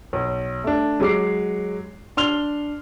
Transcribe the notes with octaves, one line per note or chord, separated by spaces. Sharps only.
B1
A3 D4
F#3 G#3 D6 C7
D4 C6 F6 F7 G7